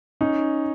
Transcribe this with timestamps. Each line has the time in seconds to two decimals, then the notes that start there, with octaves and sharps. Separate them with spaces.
0.21 C#4 D#4